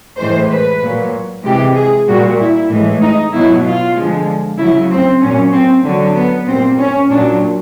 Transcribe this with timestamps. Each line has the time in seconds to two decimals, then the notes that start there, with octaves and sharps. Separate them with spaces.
0.18 A2 E3 G#3 C5
0.49 B4
0.82 A#2 F#3
1.44 C3 E3 G#3 G4
1.76 G#4
2.07 A#2 G3 F#4
2.39 E4
2.70 A2 E3 G#3
3.01 D#4
3.33 B2 F#3 E4
3.65 F4
3.95 D3 F3 G#3
4.58 C#3 F#3 E4
4.91 C4
5.21 A#2 F#3 C#4
5.53 C4
5.84 D3 F#3
6.16 B3
6.47 A#2 G3 C4
6.79 C#4
7.09 A#2 F#3 D4